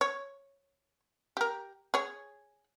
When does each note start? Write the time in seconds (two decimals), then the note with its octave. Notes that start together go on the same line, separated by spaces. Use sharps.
0.01 C#5
1.37 G4 A#4
1.94 G#4 C#5